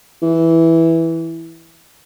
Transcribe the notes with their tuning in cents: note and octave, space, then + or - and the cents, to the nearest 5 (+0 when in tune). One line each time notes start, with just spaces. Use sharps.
E3 -5